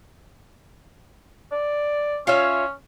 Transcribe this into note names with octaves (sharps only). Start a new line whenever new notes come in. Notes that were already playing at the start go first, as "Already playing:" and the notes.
D5
C#4 F4 C#5 E5